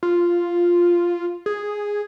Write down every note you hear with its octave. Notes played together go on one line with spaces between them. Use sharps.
F4
G#4